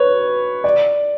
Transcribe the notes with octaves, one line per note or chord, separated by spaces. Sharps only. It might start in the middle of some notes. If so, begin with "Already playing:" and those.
Already playing: B4 C#5
D5